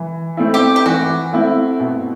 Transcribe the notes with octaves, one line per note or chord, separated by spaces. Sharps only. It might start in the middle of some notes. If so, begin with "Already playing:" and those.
Already playing: E3
A3 C4 E4
G4
G4
E3 F#4
A3 C4 E4
B2